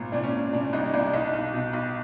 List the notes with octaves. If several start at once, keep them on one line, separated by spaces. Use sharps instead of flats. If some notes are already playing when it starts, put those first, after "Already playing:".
Already playing: G#1 A#2
A#2 D4
C#4
A#2
A#2 D4
C2 D#4
C2 D4
B1 D#4
B1
B2
B1